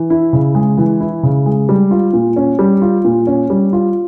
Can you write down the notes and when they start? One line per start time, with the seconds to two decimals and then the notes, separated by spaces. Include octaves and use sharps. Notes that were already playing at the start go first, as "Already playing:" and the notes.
Already playing: E3
0.10 E4
0.33 C#3
0.55 G#3
0.78 E3
1.00 E4
1.23 C#3
1.46 G#3
1.69 G3
1.91 F4
2.13 A#2
2.36 C#4
2.59 G3
2.82 F4
3.05 A#2
3.27 C#4
3.50 G3
3.73 F4